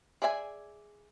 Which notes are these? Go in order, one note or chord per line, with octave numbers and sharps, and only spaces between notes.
G#4 D5 E5 F#5 G#5